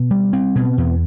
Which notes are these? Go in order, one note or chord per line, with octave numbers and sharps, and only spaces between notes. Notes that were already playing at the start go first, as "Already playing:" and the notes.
Already playing: B2
G3
C4
B2
E2